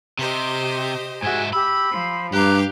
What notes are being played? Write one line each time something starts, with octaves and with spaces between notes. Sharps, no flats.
C3 G4 C5 D#5
G#2 F#4 G#4 E5 G#5
G4 B5 E6
F3 C5
G2 G4 F5 A#5 D6 F#6